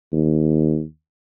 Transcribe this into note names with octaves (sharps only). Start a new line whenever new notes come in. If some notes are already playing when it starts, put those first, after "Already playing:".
D#2